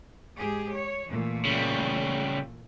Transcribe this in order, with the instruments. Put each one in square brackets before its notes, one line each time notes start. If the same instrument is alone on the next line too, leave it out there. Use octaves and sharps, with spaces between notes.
[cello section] G#2 G4 G#4
C#5
A#2 E3 A3
[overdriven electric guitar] C#3 G3